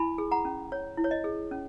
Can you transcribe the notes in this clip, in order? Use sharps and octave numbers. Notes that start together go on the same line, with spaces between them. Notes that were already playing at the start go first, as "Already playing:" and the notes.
Already playing: E4 G#5 B5
G#4
F#5 A#5
C#4
C#5
E4
C#5
D#5
G#4
C#4